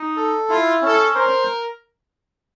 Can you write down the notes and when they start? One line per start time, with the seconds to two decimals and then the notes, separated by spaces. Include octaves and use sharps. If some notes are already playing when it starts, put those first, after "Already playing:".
Already playing: D#4
0.17 A4
0.49 E4 F4
0.82 C#4 A4
1.15 A#4 C5